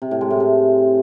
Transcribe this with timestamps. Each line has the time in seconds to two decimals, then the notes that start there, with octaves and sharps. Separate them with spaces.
0.02 C3
0.11 A2
0.21 G#3
0.31 A2
0.40 C3